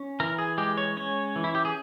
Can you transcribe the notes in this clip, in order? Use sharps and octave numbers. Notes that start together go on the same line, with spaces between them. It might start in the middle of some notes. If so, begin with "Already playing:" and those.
Already playing: C#4
E3 A#4
G#4
G#3 G4
C#5
C#4 C#5
E3
E4
G4
G#4